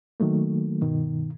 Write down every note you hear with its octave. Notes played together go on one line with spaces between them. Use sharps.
D#3 F#3 A3 A#3
G2 B2 D#3